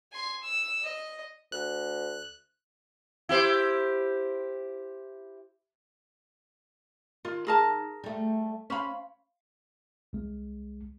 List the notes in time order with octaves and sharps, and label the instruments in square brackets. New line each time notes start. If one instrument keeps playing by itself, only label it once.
[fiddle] G#5 C6
E6
D#5
[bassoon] D2 [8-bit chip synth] F#6
[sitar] E4 G4 C5
[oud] D#3 [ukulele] F4
[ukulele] G#4 A#4 A5
[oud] G3 A3
[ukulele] C#4 B5 [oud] C5 F5
[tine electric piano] C2 G#3